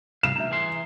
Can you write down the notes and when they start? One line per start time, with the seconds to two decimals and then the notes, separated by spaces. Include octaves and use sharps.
0.23 G#2 C3 G3 F5 E7
0.36 D2 E5 A#5
0.50 E3 G#4 C6